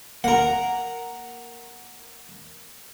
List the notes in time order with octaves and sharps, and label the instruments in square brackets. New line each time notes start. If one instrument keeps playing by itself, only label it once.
[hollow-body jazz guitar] A#3 A#4 [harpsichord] F#5 A#5